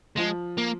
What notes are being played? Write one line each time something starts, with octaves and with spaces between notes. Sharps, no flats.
F3 G#3
A#3